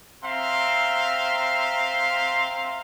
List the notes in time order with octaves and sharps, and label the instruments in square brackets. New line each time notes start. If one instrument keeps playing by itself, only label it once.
[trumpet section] C4 E5 F5 A#5 C6